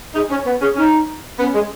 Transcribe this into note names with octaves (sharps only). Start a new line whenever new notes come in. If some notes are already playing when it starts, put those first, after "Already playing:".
D#4 G#4
C#4 C#5
B3 B4
C#4 G#4
C#4 D#4
B3 C#4
G#3